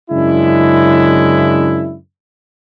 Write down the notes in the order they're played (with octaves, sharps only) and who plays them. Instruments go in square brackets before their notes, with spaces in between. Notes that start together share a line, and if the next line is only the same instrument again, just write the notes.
[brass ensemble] F#2 C#3 G#3 D4 E4